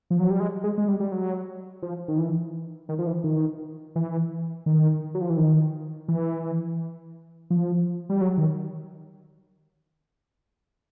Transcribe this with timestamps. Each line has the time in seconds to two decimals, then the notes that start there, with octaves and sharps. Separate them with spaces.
0.10 F3
0.19 F#3
0.30 G3
0.40 G#3
0.64 G#3
0.78 G#3
0.88 G3
1.00 G3
1.12 F#3
1.82 F3
2.08 D#3
2.18 E3
2.89 D#3
2.99 F3
3.07 E3
3.24 D#3
3.96 E3
4.66 D#3
5.15 F#3
5.21 F3
5.30 E3
5.37 D#3
6.08 E3
7.50 F3
8.09 G3
8.21 F#3
8.38 D#3